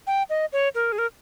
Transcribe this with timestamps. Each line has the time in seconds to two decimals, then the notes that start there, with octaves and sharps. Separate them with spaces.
0.07 G5
0.30 D#5
0.53 C#5
0.75 A#4
0.92 G#4
0.98 A#4